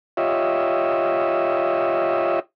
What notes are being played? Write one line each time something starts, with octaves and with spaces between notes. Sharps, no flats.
F4 G4 C#5 D#5 E5